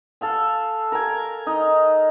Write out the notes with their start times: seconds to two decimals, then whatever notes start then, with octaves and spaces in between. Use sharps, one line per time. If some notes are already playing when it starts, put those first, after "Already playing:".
0.21 A4 F5 G#5
0.92 A#4 G#5
1.47 D#4